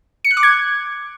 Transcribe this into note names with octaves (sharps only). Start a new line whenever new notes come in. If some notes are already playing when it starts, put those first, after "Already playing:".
C#7
F#6
D6
G#6